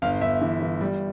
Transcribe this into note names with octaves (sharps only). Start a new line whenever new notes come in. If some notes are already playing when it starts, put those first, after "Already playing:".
G1 F5
G1 E5
E3
E3
G3